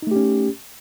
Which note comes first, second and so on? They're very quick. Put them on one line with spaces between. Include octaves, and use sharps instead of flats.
D#4 A3 G4 C#4